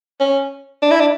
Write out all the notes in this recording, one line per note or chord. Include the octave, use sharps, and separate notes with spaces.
C#4
D4
E4
D4